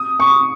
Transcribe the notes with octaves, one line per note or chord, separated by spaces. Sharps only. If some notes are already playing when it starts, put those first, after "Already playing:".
Already playing: D#6
C#6